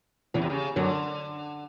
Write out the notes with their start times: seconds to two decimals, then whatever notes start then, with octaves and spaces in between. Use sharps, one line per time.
0.34 E2 C#3 E3
0.42 C3
0.50 C#3
0.76 F#2 D3 F#3